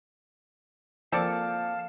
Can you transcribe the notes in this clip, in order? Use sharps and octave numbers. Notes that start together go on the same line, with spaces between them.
F3 A#3 C4 A4 D5 F5 A5 F6